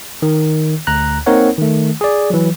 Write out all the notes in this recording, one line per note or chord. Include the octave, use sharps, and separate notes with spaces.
D#3
D2 A#5 F#6
A#3 C4 D#4 A#4 C#5 F#5
D#3 A3
G#4 D5
E3 F#3